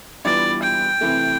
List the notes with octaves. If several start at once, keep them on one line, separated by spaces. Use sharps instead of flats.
E3 G3 B3 D4 F4 D5
G5
C3 E3 A3